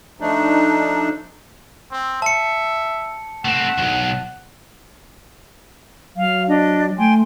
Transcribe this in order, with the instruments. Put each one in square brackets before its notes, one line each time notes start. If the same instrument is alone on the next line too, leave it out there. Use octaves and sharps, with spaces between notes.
[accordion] F3 A3 D4 D#4
[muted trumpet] C4
[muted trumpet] E5 [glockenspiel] A5 C#7
[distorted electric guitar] A3 C4 [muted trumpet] F#5
[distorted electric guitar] B1 F2
[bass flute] F#3 [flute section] F5
[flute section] D4 D#5
[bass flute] A3 [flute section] G5 G#5 C6